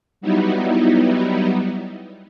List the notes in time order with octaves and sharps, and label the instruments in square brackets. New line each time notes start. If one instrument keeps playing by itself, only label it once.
[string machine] F#3 G3 B3 D#4 E4